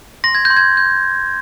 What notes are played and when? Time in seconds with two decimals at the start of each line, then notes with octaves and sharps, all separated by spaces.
0.24 C6 A#6
0.35 G#6
0.45 G6
0.50 C6
0.57 G#6
0.77 G6